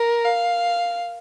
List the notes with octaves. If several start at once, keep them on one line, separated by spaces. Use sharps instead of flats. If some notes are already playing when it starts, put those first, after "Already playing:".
Already playing: A#4
F5